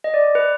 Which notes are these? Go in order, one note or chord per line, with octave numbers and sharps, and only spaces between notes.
D#5
D5
B4